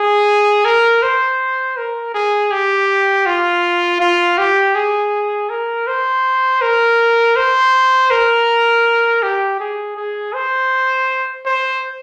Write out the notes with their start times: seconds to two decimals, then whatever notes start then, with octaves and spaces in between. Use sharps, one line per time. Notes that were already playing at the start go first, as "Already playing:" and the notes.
Already playing: G#4
0.65 A#4
1.02 C5
1.77 A#4
2.14 G#4
2.51 G4
3.26 F4
4.00 F4
4.38 G4
4.75 G#4
5.49 A#4
5.87 C5
6.62 A#4
7.36 C5
8.11 A#4
9.23 G4
9.60 G#4
9.97 G#4
10.34 C5
11.46 C5